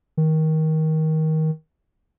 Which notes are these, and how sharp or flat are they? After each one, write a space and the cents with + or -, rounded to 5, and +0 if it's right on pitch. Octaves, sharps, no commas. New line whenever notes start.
D#3 +20